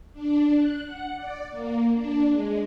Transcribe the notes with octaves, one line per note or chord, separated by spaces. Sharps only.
D4
F#6
F#5
D5
A#3
D4
G#3